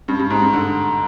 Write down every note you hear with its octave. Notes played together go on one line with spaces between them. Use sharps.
G2
G2
G#2
G2
D3